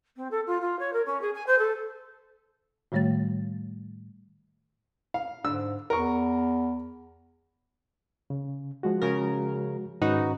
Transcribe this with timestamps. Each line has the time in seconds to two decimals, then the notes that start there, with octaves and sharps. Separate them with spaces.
0.16 C4
0.31 A4
0.46 F4
0.61 F4
0.79 C#5
0.93 A#4
1.06 C#4
1.21 G#4
1.34 G#5
1.46 C5
1.58 A4
2.92 A2 D#3 G3 A3 C#5 A6
5.14 F5
5.44 G#2 D3 E6
5.90 E2 A#4 C#6
8.30 C#3
8.83 F3 G#3 F#4
9.02 C#3 A#4
10.02 G#2 D#3 C#4 D#4 F#4 B4